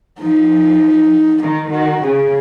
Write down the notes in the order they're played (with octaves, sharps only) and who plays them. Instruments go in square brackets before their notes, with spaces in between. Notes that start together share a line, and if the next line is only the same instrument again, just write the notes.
[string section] F3 [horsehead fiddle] D#4
[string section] D#3 [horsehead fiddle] D#4
[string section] D#3 [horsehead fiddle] F#4
[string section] C#3 [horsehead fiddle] G#4